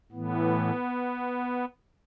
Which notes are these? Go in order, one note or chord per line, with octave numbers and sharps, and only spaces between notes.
A2 E3 B3